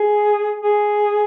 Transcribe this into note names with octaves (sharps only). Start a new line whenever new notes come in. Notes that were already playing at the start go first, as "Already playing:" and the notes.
Already playing: G#4
G#4